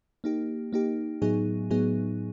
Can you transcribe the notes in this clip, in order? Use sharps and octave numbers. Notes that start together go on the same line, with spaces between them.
A#3 D#4 G4
A#3 D#4 G4
A2 F#3 B3 D#4 G#4
A2 F#3 B3 D#4 G#4